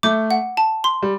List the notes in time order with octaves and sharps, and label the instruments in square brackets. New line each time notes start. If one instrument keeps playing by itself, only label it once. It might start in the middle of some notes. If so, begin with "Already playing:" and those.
[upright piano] A3 [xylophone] D6
[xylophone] F#5
A5
C6
[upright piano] G3